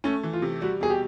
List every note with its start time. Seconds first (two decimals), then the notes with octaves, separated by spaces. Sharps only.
0.04 A3 C#4
0.23 E3
0.33 F4
0.42 C3
0.61 G3 F#4
0.80 B2 G#4
0.90 G4